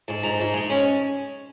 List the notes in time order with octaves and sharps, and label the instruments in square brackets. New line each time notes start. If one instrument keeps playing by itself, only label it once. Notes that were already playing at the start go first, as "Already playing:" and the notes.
[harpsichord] G#2
G#2 A#5
G#2
G#3
C#4